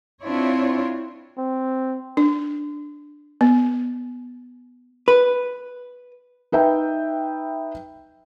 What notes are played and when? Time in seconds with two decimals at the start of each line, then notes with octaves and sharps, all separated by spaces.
0.21 C4 D4 E4 F4 C#5
1.38 C4
2.17 D4
3.41 B3
5.08 B4
6.52 D#4 B4 E5 G5